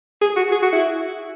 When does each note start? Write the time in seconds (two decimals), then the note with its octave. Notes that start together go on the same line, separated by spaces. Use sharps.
0.21 G#4
0.36 F#4
0.52 G#4
0.63 F#4
0.73 E4